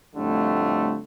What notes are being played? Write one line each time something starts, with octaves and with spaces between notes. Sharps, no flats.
F2 A2 D3 G3 A3